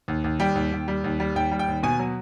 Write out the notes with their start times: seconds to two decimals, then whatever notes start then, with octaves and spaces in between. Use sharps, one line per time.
0.08 D#2
0.24 D#2
0.40 G3 G5
0.55 D#2
0.72 D#2
0.88 G3
1.04 D#2
1.20 G3
1.35 D#2 G5
1.52 G3
1.59 G5
1.68 D#2
1.83 B2 G#5
1.99 F#3